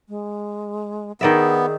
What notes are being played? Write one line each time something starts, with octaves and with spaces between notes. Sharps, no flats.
G#3
D#3 B3 G#4 D5 E5